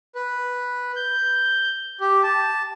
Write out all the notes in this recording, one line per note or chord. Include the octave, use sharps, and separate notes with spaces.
B4
G6
G4
A5